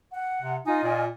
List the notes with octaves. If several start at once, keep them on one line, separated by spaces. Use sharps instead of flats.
F#5
C3
D#4 F4 D#5 G#5
A#2